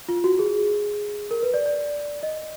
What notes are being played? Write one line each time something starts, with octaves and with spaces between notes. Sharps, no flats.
F4
F#4
G#4
A#4
B4
D5
D5
D#5